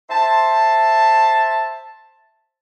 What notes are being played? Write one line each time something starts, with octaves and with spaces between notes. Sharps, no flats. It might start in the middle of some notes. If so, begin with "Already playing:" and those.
C5 E5 A5